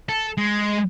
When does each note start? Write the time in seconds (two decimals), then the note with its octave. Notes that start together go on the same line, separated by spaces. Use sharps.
0.09 A4
0.38 G#3